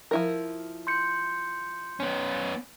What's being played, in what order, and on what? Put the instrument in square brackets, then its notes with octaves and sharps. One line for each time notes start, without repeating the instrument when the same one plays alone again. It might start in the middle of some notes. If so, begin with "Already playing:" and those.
[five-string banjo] F3 E4 A#4
[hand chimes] C6 G6 C#7
[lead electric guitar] B3 C#4